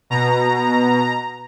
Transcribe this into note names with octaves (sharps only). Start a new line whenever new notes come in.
B2 A#5